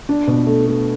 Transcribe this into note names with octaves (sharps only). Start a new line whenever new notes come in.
D4
B2
A3
A3